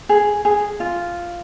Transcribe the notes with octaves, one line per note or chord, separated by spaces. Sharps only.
G#4
G#4
F4